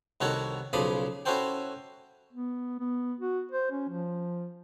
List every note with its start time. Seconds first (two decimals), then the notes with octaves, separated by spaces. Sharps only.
0.21 C2 D#3 F#4 A4 C#5 F#5
0.73 B1 C#3 F3 D5 B5 D#6
1.26 C#4 E4 F#4 A4 C5 G5
2.33 B3
2.80 B3
3.20 F#4
3.51 C5
3.72 C#4
3.89 F3